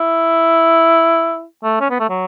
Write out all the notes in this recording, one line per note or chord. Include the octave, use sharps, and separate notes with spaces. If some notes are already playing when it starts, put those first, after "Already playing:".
Already playing: E4
A3
C#4
B3
A3
F#3